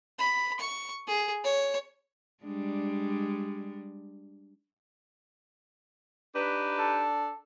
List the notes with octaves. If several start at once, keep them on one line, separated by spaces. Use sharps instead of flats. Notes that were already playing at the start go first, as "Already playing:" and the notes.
B5
C#6
G#4
C#5
G3 G#3 D4
D4 D#4 G4 B4
A4